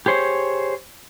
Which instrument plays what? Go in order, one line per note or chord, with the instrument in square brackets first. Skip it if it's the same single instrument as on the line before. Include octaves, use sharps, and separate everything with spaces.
[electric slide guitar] G4 G#4 C5 C#5